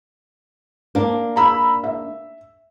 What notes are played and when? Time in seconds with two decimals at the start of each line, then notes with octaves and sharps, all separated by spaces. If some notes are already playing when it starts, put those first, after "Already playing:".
0.95 A#3 D4
1.36 A#5 B5 E6
1.84 E5